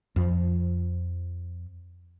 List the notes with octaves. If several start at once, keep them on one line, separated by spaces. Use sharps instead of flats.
F2 F3